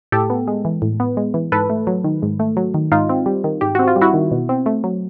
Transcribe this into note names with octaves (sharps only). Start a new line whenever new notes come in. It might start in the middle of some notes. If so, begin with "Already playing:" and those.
A2 G4 A4
B3
G#3
E3
A2
B3
G#3
E3
G#2 A4 B4
A3
F#3
D#3
G#2
A3
F#3
D#3
G#2 D#4 F4
C4
G3
D#3
G#2 G4
C4 F#4
F4
G3
E4 F#4
D#3
B2
C4
A3
F#3